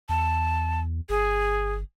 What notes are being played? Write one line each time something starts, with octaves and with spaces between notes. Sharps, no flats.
E2 A5
G1 G#4